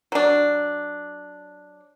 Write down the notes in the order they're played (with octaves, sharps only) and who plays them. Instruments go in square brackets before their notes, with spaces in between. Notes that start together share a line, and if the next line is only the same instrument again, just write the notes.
[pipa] F#3 D4